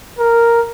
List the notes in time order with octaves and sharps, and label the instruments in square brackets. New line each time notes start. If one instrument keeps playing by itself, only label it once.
[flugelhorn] A#4